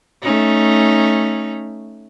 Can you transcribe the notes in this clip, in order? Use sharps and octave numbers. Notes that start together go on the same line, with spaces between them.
A3 C#4 D#4